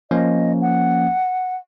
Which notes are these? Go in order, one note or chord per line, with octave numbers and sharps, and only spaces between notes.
F3 A#3 C#4 D#5
F#5